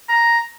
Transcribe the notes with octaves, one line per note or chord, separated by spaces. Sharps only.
A#5